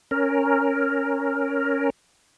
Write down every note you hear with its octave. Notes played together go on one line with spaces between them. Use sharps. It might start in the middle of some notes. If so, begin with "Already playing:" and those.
C#4 A#4